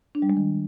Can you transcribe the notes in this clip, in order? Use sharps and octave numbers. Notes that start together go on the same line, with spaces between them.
D4
G3
G#3
D#3